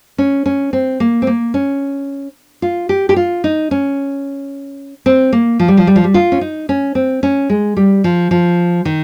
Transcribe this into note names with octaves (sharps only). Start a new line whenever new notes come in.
C#4
C#4
C4
A#3
C4
A#3
C#4
F4
G4
G4
F4
D#4
C#4
C4
A#3
F3
G3
F3
G3
F3
G3
F4
C#4
D#4
C#4
C4
C#4
G#3
G3
F3
F3
D#3